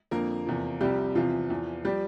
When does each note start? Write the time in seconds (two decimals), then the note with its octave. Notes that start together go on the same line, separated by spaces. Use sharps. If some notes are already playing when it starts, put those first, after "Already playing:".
0.11 F2 D3 F3 A#3 A#4
0.46 E2 C3 F3
0.81 C2 C3 F3 G3 G4
1.15 E2 C3 E3 F3 F4
1.50 E2 E3
1.84 F3 G3 G4